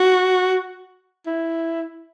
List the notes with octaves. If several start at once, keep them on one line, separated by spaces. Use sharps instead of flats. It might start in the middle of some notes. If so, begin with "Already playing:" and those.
Already playing: F#4
E4